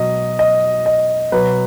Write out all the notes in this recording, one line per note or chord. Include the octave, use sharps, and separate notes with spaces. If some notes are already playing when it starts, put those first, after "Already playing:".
Already playing: B2 F#3 D#5
D#5
D#5
B2 F#3 B4